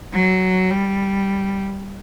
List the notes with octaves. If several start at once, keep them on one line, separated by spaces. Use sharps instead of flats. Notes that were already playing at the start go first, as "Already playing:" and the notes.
F#3
G3